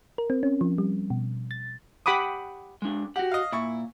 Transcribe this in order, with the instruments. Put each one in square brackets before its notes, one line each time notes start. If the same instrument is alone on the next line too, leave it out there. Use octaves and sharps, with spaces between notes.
[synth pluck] A#4
C4
C#4
F3
G3
B2
A6
[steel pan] G4 F#5 B5 D6 D#6
[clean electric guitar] G#3 D4
[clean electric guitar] F#4 F#5 [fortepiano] G4
[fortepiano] D#5 F5
[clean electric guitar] A#2 [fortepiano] E4 C#6